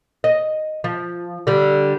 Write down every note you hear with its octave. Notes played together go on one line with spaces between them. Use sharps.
D#5
F3
D3 G3